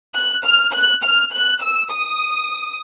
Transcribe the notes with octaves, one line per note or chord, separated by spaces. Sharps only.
F#6
F6
F#6
F6
F#6
E6
D#6